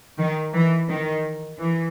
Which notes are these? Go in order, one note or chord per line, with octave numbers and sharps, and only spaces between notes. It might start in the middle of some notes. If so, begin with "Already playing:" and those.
D#3
E3
D#3
E3